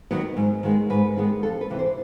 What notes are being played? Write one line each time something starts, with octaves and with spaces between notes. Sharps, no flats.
D#3 F#3 B3
G#2
D#3 G#3 B3
G#2 B4
D#3 G#3 B3
F2 A4
B4
C3 E3
C5